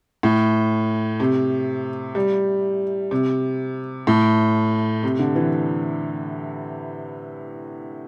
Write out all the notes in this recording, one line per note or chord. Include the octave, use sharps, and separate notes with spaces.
A2
C3
G3
C3
A2
C3
D3
E3